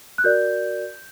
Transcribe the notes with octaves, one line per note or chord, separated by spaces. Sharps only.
F#6
F#4 A#4 D5 G6